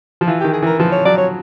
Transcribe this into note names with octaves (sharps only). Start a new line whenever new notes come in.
F3
E3 F4
D#3 G4
G#4
E3 A#4
F3 B4
C#5
F#3 D5
C#5